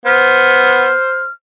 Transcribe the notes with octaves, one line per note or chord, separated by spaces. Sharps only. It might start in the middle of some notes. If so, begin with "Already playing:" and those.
B3 C5 F6